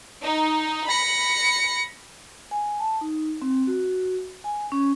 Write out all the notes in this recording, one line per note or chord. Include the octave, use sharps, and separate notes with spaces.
D#4
B5 A#6 C#7
G#5
A5
D#4
C4
F#4
G#5
C#4